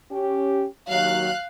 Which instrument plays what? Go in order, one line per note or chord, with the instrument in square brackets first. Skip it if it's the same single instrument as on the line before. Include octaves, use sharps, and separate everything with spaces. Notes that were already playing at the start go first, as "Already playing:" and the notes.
[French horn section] C#4 G4
[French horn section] D#2 F#3 [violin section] F5 F#6